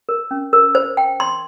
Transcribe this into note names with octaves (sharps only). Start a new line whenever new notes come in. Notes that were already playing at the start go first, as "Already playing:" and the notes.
A#4
C#4
A#4
C5
G5
C6